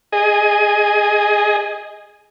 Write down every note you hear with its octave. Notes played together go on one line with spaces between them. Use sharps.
G#4 D#5